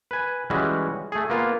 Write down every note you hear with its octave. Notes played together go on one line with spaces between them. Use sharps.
B4 G#5
E3 G3 G#3 C#4 F#4
A3 G#4
A#3 B3 F4